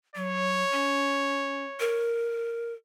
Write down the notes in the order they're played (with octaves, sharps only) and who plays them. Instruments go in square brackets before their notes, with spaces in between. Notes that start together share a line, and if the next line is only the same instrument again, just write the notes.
[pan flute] F#3 [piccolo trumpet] C#5
[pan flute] C#4
A#4